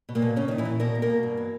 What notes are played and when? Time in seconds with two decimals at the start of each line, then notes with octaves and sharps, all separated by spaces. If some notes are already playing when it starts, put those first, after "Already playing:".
0.09 B2
0.15 A#2 A#3
0.22 B2
0.36 A#2 C#3 C#4
0.48 A#2 D#3 D#4
0.58 E3 E4
0.65 A#2
0.80 B2 A#3 A#4
0.95 B2
1.02 A#3 A#4
1.10 B2
1.23 G2
1.37 E3